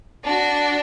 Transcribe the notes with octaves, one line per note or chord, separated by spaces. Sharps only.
D4 F#4